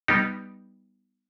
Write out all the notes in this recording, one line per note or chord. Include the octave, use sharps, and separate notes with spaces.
G3 B3 D#4 G4